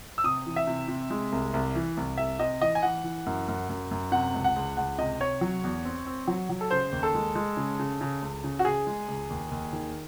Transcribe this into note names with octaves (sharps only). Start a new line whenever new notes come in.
E6
C3 D#6
E3
E5
C3
C3
G#3
C2
C2
E3
C2
C2 E5
C3 D#5
E3 D#5
G#5
E3 F#5
E3
F#2
F#2
F#2
F#2
C3 F#5
C#2
F#5
C#2
C#2 F#5
C3 D#5
C3 C#5
F#3
E2
C4
C4
F#3
F#3
A4
C#3 C5
D#2
A4
G#3
G#3
C#3
C#3
C#3
C#2
C#3
F#4
C#3 G#4
G#3
C#2
D#2
D#2
D#3